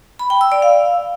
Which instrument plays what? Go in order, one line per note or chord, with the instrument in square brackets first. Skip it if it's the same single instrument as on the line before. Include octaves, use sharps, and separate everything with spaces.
[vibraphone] B5
G5
E6
D5
F5